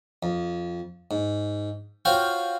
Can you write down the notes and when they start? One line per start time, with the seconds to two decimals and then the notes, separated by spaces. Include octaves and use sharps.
0.23 F2
1.11 G#2
2.05 F4 F#4 C5 C#5 F5 G5